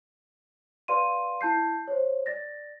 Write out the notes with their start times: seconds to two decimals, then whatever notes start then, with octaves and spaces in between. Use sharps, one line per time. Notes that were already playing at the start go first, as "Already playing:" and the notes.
0.88 B4 D5 F5 C6 D#7
1.41 E4 A5 G6 C7
1.88 C5 C#5
2.26 D5 A6 A#6